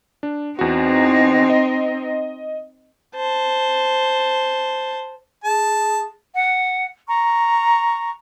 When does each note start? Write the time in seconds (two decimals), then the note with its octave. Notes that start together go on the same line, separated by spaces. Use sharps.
0.23 D4
0.59 E2 C4 D#4 F#4
1.50 D#5
3.16 C5 A5
5.44 G#4 A5
6.36 F#5
7.08 A#5 C#6